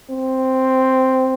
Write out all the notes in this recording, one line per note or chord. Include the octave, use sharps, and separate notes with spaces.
C4